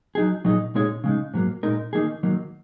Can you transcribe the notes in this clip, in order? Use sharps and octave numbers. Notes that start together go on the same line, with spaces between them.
F#3 D#4 G#4
A#2 F#3 D#4 G#4 D#5
A#2 G#3 D#4 G#4 C#5
C#3 G#3 D#4
G#2 F#3 A#3
A#2 G#3 D#4 A#4
D#3 A#3 D#4 G#4
D#3 F#3 A#3